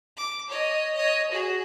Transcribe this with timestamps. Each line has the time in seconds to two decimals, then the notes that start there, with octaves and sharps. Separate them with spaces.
0.17 D6
0.48 C#5 D#5
0.95 C#5 D#5
1.31 F#4 G#4